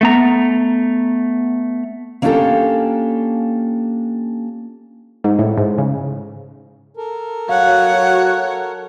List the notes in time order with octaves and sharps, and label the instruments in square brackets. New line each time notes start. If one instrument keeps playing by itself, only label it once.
[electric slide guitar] A3 B3 A#5
[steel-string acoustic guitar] A#3 C#4 D4 F4 G4 A4
[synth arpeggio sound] G#2
A2
G#2
C#3
[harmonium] A4 A#4
[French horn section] F#3 F#4 [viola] C#5 F#5 [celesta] F5